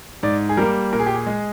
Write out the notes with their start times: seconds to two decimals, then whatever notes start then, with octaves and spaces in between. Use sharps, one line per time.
0.23 G#2 D5
0.49 G#4
0.57 G3 A#3 A#4
0.93 A#2 A#4
1.00 G#4
1.06 G4
1.14 G#4
1.27 G#3